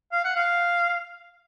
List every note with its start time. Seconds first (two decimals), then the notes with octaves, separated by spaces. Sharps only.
0.12 F5
0.25 F#5
0.36 F5